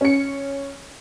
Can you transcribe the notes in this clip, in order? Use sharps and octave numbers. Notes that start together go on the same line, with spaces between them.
C#4 C#7